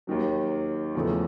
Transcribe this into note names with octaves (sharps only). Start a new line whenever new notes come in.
D#2 D#3 F#3
E2 C#3 F3 A3